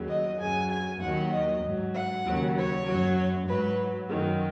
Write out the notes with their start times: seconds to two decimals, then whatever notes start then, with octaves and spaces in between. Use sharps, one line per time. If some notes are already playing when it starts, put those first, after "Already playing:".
Already playing: D#2 C#3 F#3
0.09 D#5
0.39 F#2 C#3 F#3 G#5
0.70 G#5
1.01 D#2 D#3 F#3 F#5
1.32 D#5
1.63 G#2 F#3
1.93 F#5
2.25 D#2 C#3 F#3
2.56 C#5
2.86 F#2 F#3
3.47 G#2 F#3 B4
4.10 F#2 D#3 F#3